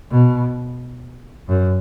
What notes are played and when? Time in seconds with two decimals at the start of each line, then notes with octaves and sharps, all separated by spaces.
0.11 B2
1.49 F#2